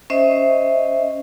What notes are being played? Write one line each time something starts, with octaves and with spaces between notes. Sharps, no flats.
C#4 C5 D#5 E5